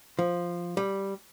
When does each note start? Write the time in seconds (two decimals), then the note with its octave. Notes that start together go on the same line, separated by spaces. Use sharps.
0.19 F3
0.77 G3